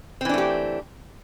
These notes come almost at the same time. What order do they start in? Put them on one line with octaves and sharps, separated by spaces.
C4 E3 D4 A3 G4